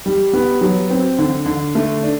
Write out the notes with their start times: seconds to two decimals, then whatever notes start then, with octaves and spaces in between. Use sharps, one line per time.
0.06 G3
0.33 B3
0.61 F#3
0.90 C4
1.18 D3
1.46 D3
1.75 A3
2.03 D4